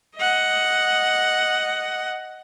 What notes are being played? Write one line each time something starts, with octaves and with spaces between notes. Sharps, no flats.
D#5 F#5